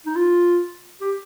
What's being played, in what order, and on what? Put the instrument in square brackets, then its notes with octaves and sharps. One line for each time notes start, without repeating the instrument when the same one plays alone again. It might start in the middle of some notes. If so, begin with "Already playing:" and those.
[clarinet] D#4
F4
G4